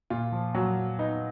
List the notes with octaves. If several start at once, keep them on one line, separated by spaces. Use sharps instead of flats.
A#2 F4
F3
A#2 F#3 F#4
F3
B3 D#4